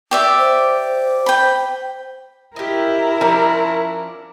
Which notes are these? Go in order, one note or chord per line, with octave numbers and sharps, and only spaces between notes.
G4 D5 E5
C5
G5 B5
E4 G4 A#4 D#5
F3 C#4 D4 A#5